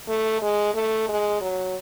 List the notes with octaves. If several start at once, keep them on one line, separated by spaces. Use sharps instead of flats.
A3
G#3
A3
G#3
F#3